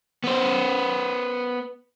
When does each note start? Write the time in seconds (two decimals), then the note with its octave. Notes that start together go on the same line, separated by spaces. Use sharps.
0.24 B3 C5